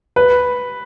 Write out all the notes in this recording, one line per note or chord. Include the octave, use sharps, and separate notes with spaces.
B4